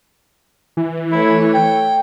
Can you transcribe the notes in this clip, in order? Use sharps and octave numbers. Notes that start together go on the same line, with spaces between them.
E3
A3 E4 C#5
G5